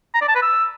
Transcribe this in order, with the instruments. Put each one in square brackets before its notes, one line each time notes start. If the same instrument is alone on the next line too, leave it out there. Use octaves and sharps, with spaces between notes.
[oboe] A#5
D5
A5
B4
E6